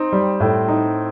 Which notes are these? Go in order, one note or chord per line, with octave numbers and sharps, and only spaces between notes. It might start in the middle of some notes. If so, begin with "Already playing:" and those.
Already playing: C4 D#4
G3
A2
D#4